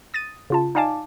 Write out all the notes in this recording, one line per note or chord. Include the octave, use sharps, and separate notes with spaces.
D#6 A6 A#6 D#7
C#3 F4 A5
D#4 D5 F5 G#5 A5 D6